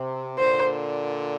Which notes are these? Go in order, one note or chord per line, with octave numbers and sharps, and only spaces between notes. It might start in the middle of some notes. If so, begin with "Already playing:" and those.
Already playing: C3
A#2 D3 C5